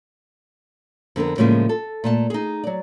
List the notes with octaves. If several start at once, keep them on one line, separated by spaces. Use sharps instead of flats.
F2 D3 B3 A#4
A2 C#3 F3 G3 G#3 A#3
A4
A#2 A3 A5
D#4 G#4
F#3 D5